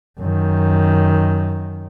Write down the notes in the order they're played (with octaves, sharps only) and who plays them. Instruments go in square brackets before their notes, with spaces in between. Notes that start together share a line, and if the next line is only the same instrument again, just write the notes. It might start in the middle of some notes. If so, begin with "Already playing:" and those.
[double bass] F#2 D#3